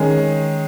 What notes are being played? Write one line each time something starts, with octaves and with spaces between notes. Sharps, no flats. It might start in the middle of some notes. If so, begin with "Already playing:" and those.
Already playing: D#3 G#3 C#4